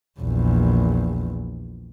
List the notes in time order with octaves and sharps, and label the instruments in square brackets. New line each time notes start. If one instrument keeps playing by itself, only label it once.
[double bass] A#1 E2